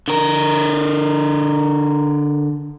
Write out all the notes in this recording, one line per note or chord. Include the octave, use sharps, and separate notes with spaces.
D3 A#4